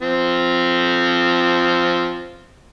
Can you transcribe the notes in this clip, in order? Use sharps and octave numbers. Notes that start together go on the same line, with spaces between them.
F3 C4